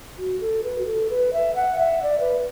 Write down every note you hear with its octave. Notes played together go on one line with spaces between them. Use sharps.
F#4
A4
B4
F#4
A4
B4
E5
F#5
E5
D5
B4